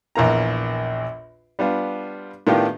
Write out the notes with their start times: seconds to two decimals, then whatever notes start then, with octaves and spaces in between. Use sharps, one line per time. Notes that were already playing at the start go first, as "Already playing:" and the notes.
0.15 A#1 E2 A#3 A#5
1.59 G3 B3 D4 F4
2.47 A2 D#3 B3 D4 F4 G4